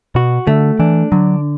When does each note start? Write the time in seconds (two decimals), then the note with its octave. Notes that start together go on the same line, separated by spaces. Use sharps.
0.15 B2 F#4
0.47 D3 A3
0.79 E3 D4
1.12 D3 F#3